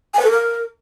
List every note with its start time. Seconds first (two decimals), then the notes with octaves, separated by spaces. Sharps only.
0.14 G#5
0.19 B4
0.25 A4
0.30 A#4